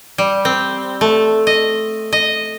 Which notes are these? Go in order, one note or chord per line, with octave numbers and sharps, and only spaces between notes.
G3
C4
A3
D#5
D#5